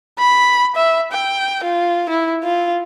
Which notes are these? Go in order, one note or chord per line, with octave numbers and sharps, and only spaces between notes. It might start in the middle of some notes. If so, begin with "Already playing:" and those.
B5
E5
G5
F4
E4
F4